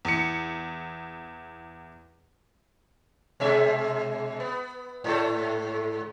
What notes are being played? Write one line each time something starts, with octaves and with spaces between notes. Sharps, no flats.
E2 C#7
B2 G#3 E5
B3
G#2 A3 A4